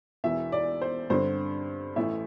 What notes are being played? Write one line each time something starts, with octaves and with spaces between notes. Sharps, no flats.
E1 E2 E3 E5
D5
C5
G2 D3 C4 C5
A1 A2 E3 A3 E5